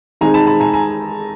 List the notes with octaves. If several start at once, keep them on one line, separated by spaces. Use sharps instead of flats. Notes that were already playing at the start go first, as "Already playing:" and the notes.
D#3 G#3 C4 D#4 G#5 A#5
A5 B5
A5 B5
G#5 A#5
G#5 A#5